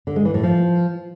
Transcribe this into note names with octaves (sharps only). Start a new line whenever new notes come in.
D3
G#3
E3
A2
F3